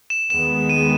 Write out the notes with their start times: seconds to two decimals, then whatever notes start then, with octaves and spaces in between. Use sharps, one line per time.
0.10 E7
0.30 D#2 D#3 G#3 B3 E7
0.69 D#7